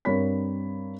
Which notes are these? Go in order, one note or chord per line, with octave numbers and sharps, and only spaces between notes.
G2 C4 A#4 C#5 B5 B6